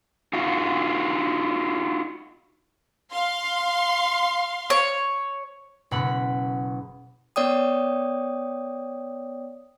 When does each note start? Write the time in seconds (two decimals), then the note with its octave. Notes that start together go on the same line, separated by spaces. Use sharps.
0.33 D#4 F4 F#4
3.11 F5 C6
4.70 C#5
5.91 F#1 B2 F#5 B5 C#6 F#6
7.36 B3 C#5 D5 G5 D#6